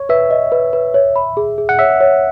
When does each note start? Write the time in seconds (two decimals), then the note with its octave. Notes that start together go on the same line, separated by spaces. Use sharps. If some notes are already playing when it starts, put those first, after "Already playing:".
Already playing: C#5
0.09 B4 E5
0.31 D#5
0.52 B4
0.73 B4
0.94 C#5
1.16 B5
1.37 G#4
1.58 G#4
1.69 F#5
1.79 C#5 E5
2.00 C#5